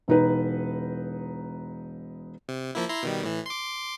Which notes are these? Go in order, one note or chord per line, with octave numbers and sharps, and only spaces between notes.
E1 D#4 B4
C3
F3 A#3 E4
E4 A#5 C6
B2 D#3 G3
A2 E3
C6 D6